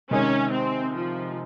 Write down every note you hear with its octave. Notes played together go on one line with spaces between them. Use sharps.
C3 D#3 G#3 C#4 D#4
C4
F3